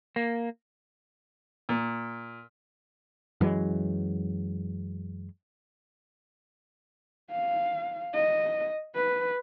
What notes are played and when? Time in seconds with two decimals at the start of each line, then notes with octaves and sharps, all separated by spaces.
0.16 A#3
1.69 A#2
3.41 F#2 E3 F#3 G#3
7.30 F5
8.14 D#5
8.95 B4